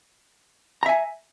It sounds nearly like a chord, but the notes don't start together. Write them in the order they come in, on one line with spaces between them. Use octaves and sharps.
A#5 E5 G#5